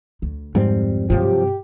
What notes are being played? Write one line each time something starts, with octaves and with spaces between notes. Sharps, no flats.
D2
F2 G#2 G3 C4
G2 C3 F3 F#3 G4